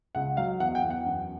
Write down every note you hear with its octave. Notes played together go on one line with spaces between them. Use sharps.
C#2 F#5
F#3 F5
E2 F#5
G5
E2
F#5
F#2